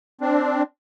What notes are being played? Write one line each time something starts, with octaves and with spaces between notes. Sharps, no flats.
C4 D4